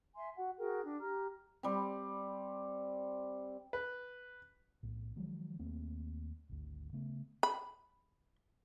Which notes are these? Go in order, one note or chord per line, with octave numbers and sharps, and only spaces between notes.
E5 G#5 C6
F#4 F#5
F#4 G#4 A#4 G5
D4
G4 A#5 F6
G3 C4
B4
B1 A2
D#3 F3 F#3 G#3
D#2 A3 A#3 C4
G#1 D2
C#3 A3 B3
B5